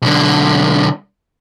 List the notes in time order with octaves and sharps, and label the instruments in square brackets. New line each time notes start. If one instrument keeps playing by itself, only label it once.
[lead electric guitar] B1 D3